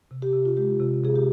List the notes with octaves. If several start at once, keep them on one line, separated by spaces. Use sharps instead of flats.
C3
G4
C3
F4
G#3 G4
C3
C3 G#4
G4